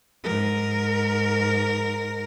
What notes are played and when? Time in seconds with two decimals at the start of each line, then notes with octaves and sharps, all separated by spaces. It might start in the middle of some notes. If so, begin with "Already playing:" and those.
0.24 G#2 A#4